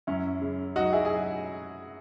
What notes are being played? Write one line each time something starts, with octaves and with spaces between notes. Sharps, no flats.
F#2 C#4 E4
C#3
F#3 D#4 F#4
E4 G#4
G#4